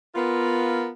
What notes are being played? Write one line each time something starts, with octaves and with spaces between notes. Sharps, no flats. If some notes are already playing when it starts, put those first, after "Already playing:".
B3 F4 A#4